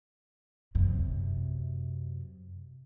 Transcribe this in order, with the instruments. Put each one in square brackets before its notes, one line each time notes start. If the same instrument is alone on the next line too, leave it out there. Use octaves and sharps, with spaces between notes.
[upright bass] F#2 C3